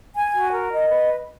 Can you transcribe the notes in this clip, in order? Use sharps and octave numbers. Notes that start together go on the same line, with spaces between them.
G#5
F#4
A#4
D#5
B4